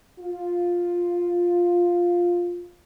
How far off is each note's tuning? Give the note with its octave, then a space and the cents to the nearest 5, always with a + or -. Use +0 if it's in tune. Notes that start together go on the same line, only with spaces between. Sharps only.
F4 +5